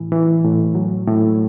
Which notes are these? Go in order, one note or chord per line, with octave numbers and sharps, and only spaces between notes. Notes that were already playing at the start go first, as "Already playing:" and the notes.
Already playing: A2 E3
E3
A2
F#3
A2